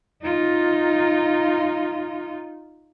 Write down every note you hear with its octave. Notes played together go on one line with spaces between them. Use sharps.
D#4 F4